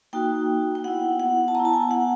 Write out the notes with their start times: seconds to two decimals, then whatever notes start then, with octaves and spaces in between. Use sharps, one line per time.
0.13 A#3 D#4 F#4 G5
0.75 G5
0.84 B3 E4 F#5
1.20 F#5
1.48 A5
1.55 B3 E4 A#5
1.65 A5
1.73 G#5
1.91 F#5